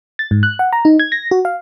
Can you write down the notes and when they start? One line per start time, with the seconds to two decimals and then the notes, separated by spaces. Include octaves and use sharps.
0.19 A6
0.31 G#2
0.43 F#6
0.59 F#5
0.73 A#5
0.85 D#4
1.00 G#6
1.12 A#6
1.31 F#4
1.45 F5